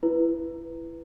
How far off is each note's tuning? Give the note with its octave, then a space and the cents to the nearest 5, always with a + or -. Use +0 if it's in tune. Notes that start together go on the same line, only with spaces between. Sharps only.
E4 +20 B4 +0